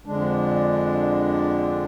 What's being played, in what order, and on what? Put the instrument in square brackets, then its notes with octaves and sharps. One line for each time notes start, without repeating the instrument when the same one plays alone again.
[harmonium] F2 D3 G#3 D4